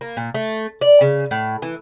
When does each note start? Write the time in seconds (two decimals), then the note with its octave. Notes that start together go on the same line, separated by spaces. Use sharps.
0.01 A#3
0.17 A#2
0.34 A3
0.81 D5
1.01 C#3
1.31 A2
1.62 E3